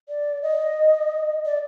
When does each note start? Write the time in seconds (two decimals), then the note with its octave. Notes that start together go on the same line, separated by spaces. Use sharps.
0.09 D5
0.42 D#5
1.45 D5